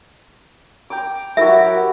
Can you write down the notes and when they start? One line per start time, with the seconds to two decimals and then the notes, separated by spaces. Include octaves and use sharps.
0.90 G5 A#5 D6
1.37 F#3 E4 F#4 G4 A#4 E5